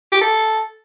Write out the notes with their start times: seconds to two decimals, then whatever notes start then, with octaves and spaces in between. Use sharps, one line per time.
0.12 G4
0.21 A4